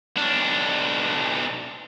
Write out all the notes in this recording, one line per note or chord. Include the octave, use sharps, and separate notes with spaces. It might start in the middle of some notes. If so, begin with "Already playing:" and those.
B1 D4